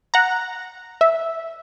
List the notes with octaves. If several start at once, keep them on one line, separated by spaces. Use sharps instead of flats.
F#5 A#5
E5